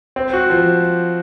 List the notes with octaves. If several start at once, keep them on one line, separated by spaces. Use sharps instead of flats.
C4
F#4
F3